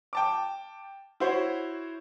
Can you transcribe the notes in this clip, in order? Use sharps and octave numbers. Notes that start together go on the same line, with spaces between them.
G5 A5 D6
E4 F#4 C5 C#5